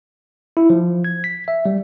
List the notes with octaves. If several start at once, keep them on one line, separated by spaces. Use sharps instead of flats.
E4
F3
G#6
B6
E5
G3